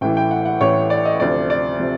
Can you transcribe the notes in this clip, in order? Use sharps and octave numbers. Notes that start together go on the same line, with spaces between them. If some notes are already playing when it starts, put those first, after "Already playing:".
A1 A2 E3 G5
G5
F#5
F#5
A1 A2 E3 C#5
D5
D#5
D2 C3 F3 D5
D5
C3 F3